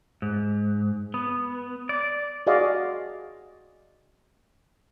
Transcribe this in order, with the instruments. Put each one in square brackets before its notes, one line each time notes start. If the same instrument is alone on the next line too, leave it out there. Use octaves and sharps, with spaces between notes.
[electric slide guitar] G#2
B3
D5
[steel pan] F#4 G#4 D5 D#5 F5